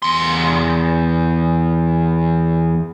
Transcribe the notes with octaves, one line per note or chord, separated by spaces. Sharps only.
E2 C6